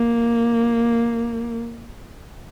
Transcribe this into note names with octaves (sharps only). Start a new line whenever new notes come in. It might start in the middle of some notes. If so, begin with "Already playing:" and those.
Already playing: A#3